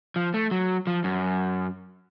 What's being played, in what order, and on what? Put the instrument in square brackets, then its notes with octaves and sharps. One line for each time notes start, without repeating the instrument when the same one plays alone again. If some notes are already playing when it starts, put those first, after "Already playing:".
[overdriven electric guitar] F3
A3
F#3
F3
F#2